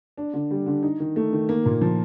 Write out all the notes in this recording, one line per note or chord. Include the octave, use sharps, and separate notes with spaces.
D4
D3
G3
D3
D#4
D#3
A3
D#3
A#3
A#2
F3